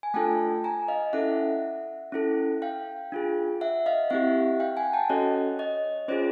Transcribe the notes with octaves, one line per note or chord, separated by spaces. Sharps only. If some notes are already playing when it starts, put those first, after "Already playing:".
G#5
A3 D4 F4 A4 G5 A5
G#5 A#5
D#5 F5
C#4 E4 A4 E5 F#5
C#4 E4 A4
F5 G5
D4 F4 G#4
E5 F#5
D#5 F5
C4 E4 G4 E5 F#5
F5 G5
F#5 G#5
G5 A5
C#4 F#4 A4 C#5 D#5
C#5 D#5
C#4 F4 G#4 C5 D5